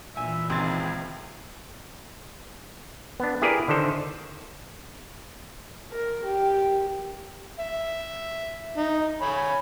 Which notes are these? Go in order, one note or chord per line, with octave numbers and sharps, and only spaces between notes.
G2 A#2 E3 E5 G#5
C#2 D#3 C4 G#4 A6
B3 D4
E4 G4 G#4 A#4 B4 D5
D3 D#3 A4 C5
A#4
G4
E5
D#4
C#5 G#5 B5